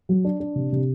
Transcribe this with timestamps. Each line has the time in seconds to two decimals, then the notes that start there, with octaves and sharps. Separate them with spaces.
0.09 F#3
0.24 D4
0.40 D4
0.55 C3
0.72 C3